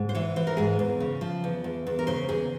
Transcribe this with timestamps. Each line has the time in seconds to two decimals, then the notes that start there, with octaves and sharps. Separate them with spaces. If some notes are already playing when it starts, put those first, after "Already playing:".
Already playing: G#2
0.09 C5
0.15 E3 C#5
0.36 E3 C5
0.47 A#4
0.57 G#2 G#4
0.79 E2
1.00 C#3
1.21 F3
1.44 E2
1.64 E2
1.87 E2
1.99 A#4
2.07 C#3 C5
2.29 E2 G#4